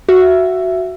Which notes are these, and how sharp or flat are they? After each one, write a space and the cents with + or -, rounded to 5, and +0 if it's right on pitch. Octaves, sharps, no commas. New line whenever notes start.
F#4 +0 E5 +15